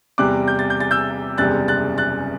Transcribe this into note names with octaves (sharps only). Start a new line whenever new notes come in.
E2 C3 G3 D6 F#6
G6
A6
G6
A6
E6 G6
F#1 E2 C3 G3 F#6 A6
F#6 A6
F#6 A6